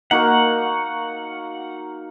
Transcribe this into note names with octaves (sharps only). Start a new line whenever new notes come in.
A#3 D#4 F#4 A#4 F#5 C#6